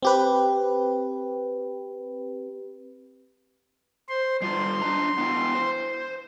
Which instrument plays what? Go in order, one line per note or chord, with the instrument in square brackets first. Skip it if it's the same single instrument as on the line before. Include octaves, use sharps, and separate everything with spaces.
[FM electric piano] C4 G4 B4
[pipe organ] C5 C6
[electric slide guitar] G3 F4 [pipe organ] C6
[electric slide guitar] D4 D#4 A#5
B3 E4 G5
C5